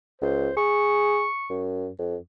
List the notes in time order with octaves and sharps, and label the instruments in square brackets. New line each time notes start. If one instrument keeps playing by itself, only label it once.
[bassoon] C#2 [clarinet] C5
[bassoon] G#4 [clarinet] C#6
[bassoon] F#2
F2